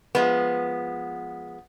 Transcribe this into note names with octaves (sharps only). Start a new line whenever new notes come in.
F3 G#3 B3